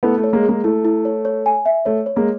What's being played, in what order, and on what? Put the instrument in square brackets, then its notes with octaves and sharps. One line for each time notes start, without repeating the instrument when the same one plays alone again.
[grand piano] A3 B3 [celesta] E4
[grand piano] A3
[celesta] C#5
[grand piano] G#3 A#3
[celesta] G#4
[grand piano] G#3 A#3
[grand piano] A3 [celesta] E4
[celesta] E4
C#5
C#5
G#5
E5
[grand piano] A3 [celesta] C#5
[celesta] C#5
[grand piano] G#3 A#3